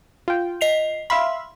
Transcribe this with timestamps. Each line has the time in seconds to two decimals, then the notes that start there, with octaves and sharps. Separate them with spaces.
0.28 F4 G5
0.61 D#5 C7 F7
1.10 E5 F5 B5 C6